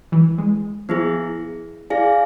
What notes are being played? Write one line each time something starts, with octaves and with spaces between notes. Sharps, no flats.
E3
G#3
F3 B3 E4 G#4
E4 G#4 D5 F5 G#5